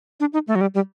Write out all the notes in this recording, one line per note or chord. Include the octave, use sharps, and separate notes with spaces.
D4
D#4
A3
F#3
G3
G3